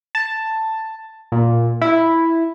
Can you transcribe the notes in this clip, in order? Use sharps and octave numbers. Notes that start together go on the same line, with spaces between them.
A5
A#2
E4